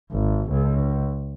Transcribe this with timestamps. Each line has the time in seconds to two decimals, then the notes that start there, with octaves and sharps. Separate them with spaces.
0.12 G#1
0.50 C#2